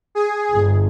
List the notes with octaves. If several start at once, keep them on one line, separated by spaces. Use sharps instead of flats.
G#4
G1